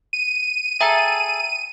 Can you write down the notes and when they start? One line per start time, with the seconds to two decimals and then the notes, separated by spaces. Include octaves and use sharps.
0.13 D#7
0.81 G#4 A4 E5 G5 A#5